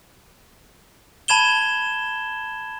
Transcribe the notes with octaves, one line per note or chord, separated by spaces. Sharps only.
A5 B5 G#6 E7 G7